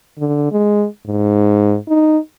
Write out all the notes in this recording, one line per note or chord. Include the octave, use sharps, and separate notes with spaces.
D3
G#3
G#2
D#4